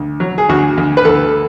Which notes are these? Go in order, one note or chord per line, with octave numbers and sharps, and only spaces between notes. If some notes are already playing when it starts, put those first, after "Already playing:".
Already playing: D2
F#3
G#4
D2 F#4
D2
B4
D2 A4